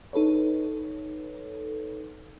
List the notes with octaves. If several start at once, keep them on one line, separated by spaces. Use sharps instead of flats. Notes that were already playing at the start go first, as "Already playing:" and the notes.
D#4 A4 B4 C#5